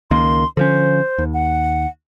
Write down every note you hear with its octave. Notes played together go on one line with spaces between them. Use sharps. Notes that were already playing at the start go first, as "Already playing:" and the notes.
C#2 D#3 A#3 C6
D3 F3 C#4 C5
D#2
F#5